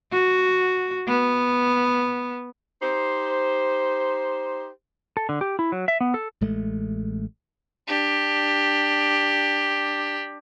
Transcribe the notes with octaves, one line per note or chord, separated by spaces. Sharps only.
F#4
B3
D#4 G4 C5
A4
D3
G4
E4
F#3
E5
B3
A4
A1 G#3 A3
D4 G4